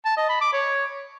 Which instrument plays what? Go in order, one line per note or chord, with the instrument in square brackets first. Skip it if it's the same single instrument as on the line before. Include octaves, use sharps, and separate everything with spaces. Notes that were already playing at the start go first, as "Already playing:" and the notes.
[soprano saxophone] A5
D#5
B5
D6
C#5